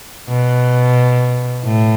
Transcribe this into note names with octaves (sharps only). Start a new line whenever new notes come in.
B2
A2